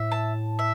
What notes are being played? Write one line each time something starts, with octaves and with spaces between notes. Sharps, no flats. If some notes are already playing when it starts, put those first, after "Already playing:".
Already playing: A2 E5
A5
E5